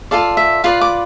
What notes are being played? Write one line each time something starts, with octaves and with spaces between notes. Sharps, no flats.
F4 A4 D5 F5
E5
F4 B4 D5 F5
D6